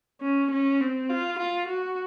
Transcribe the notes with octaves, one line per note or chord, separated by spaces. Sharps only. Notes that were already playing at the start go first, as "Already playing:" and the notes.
C#4
C#4
C4
F4
F4
F#4